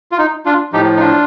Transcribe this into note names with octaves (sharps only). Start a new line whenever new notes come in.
F4
D#4
D4 F4
A2 F3 D#4 G4
D#4
D4 F4